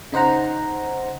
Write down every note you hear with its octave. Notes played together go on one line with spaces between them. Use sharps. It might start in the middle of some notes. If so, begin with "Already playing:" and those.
C#3 D#4 C5 F#5 A#5